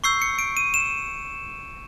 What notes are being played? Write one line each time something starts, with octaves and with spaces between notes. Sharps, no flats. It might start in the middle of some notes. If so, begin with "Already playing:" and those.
C#6 E6 G6 C7
C#7
D7
D#7
E7